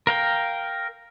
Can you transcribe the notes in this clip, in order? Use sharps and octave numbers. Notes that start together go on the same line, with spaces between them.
A#4 F5 G5